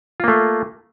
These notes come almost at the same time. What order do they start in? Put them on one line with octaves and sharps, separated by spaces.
F4 A#3 A3